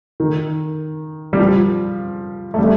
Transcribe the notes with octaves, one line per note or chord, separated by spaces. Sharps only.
D#3
G3
F3
A3
G3